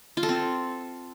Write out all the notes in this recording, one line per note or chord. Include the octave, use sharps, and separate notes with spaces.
F4
A4
C4